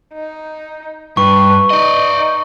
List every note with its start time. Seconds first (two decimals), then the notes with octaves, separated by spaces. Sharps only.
0.13 D#4
1.17 G2 B4 C#6
1.70 D#4 D5 D#5